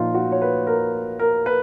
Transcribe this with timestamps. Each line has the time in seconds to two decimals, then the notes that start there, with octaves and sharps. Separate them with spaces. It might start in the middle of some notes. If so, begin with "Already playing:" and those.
Already playing: A#2 F3 D#4 F4
0.15 F#4
0.32 C#5
0.42 B4
0.67 A#4
1.19 A#4
1.46 B4